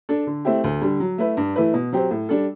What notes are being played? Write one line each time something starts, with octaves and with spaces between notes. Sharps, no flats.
D4 A4
D3
A3 C4 E4 G4
D2
D3 G3
F#3
A3 E4 B4
G2
E3 A3 E4 B4
B2
F#3 C4 G4 C5
A2
G3 D4 A4